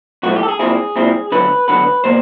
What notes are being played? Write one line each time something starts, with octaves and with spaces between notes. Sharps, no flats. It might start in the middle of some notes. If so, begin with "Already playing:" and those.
B1 A2 F3 A3 F#4
G4
A4
G#4
A#2 G3 C4 E4 G#4
A#2 G3 C4 E4
D2 D3 F#3 B3 B4
D2 D3 F#3 B3 B4
B2 G3 A#3 C5